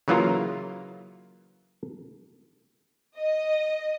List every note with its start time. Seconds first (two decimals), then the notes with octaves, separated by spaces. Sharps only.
0.08 C#3 E3 F#3 A#3 F4 A#4
3.18 D#5